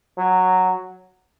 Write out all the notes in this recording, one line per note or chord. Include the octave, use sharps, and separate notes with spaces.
F#3